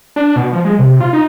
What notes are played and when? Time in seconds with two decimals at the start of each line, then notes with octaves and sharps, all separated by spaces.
0.16 D4
0.36 B2
0.53 F3
0.65 G#3
0.79 C3
1.00 F4
1.13 D#4